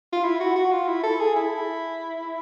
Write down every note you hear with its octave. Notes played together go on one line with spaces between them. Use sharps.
F4
E4
F#4
F#4
F4
E4
A4
G#4
E4